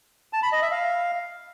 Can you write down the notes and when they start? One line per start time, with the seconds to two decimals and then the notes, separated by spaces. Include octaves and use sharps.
0.33 A5
0.43 B5
0.52 D#5
0.62 E5
0.71 F5